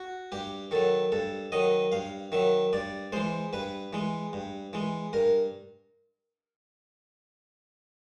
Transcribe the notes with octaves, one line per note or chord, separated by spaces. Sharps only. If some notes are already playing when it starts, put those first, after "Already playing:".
Already playing: F#4
G2 G4
D#3 F#3 A4
G2 A4
D#3 F#3 D#5
G2 F5
D#3 F#3 E5
G2 D5
E3 G#3 C5
G2 B4
E3 G#3
G2
E3 G#3
G2 A#4